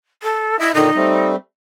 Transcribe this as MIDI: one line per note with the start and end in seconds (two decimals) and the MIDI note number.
0.23 0.59 69
0.60 0.72 64
0.60 0.69 75
0.60 0.69 76
0.75 0.90 46
0.75 0.90 50
0.75 0.90 51
0.75 1.31 63
0.96 1.36 55
0.96 1.36 57
0.96 1.36 60